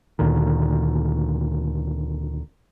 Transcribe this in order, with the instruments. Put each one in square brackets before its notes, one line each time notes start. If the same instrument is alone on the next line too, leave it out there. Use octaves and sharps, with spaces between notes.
[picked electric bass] D2 A#2 D3 D#3